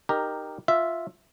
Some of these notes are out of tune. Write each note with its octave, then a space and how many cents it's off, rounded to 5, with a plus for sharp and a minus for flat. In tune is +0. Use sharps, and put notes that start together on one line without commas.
D#4 -15 G4 +0 A#4 +0
F4 +0 E5 +0